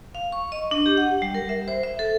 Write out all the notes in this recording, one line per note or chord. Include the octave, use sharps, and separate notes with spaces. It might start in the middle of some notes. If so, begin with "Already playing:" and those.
F5
C#6
D#5
D4
G4
F#5
G3
A#4
E5
C5
E5
A4